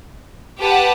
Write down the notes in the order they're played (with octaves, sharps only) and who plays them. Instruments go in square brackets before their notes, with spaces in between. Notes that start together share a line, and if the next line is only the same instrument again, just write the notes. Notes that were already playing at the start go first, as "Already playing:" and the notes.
[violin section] G4 B4 F#5 A5